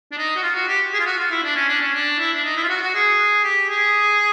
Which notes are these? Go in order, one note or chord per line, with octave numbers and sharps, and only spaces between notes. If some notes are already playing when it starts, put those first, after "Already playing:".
D4
D#4
F#4
F4
F#4
G4
G#4
F4
F#4
F4
E4
D4
C#4
D4
C#4
D4
E4
D4
D#4
E4
F4
F#4
F#4
G#4
G4
G#4